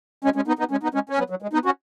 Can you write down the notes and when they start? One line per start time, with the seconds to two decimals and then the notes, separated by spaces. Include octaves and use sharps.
0.24 G#3 C#4
0.36 G#3 C#4
0.47 B3 D#4
0.59 B3 D#4
0.71 G#3 C#4
0.83 B3 D#4
0.94 G#3 C#4
1.09 C#4
1.18 F#3 B3
1.30 F#3
1.42 G#3
1.53 B3 D#4
1.65 C#4 F#4